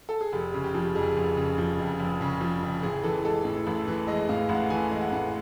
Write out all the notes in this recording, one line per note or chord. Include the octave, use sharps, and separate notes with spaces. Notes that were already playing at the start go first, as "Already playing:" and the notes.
A4
G#4
F1 G4
C#3
G4
F3
F2 G#4
F1
C#3
F3
F2
F1
C#3
F3
F2
A1 G#4
E3 A4
G#3 A4
A2
A1
E3
G#3 D#5
A2 F5
A1 F#5
E3 G#5
G#3
F#5
A2